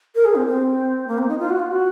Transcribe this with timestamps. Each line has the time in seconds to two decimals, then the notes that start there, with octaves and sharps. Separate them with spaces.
0.15 A#4
0.25 G#4
0.35 C4
0.46 C4
1.08 A#3
1.18 C4
1.29 D#4
1.39 F4
1.50 F#4
1.59 F4
1.71 F#4